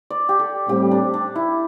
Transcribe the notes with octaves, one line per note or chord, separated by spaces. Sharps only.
D5
G4
A4
A2 G3 C4 G4
D4
D4
E4